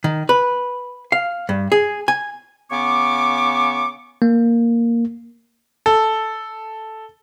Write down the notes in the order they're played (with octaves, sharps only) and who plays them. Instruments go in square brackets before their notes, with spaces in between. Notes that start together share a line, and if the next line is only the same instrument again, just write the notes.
[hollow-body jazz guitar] D#3
B4
F5
G2
G#4
G#5
[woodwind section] C#3 B3 C#6 D6
[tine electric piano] A#3
[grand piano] A4